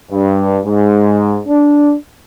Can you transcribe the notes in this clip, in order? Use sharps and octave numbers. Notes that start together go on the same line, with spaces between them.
G2
G#2
D4